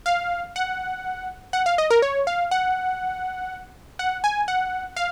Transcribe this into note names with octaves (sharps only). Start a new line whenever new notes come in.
F5
F#5
F#5
F5
D#5
A#4
C#5
F5
F#5
F#5
G#5
F#5
F5